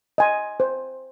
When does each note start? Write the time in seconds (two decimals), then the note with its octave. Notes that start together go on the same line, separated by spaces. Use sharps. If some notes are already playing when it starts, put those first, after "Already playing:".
0.18 D#5 G#5 C6
0.60 C5